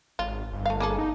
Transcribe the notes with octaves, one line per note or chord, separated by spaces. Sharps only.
G#1 F4
G1
A3 F5
A#3 G#4 A4
D#4